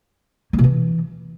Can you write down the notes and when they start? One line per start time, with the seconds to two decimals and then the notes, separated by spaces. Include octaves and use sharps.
0.53 A#3
0.58 B2
0.64 E3